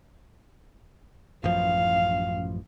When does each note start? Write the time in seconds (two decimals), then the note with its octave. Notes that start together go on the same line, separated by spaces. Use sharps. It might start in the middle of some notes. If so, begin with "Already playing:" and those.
1.44 A1 F#2 F3 F5